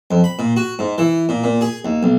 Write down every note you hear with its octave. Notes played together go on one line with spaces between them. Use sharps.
F2
B5
A#2
F#4
G#2
E3
A#2
A#2
G#4
D#2
B1